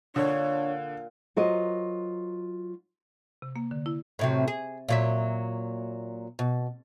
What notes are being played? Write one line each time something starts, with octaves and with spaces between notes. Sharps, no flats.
A#2 D3 D4 C#5
F#3 F4 F#4 A#4 C5 D#5
C3
A#3
D3
E4
A2 C3 F#3
G#4
A#2 F#3 E5
B2